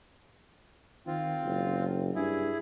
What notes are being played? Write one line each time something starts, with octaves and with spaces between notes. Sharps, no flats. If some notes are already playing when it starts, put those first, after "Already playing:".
D#3 C4 F4
F#1
G2 E4 G#4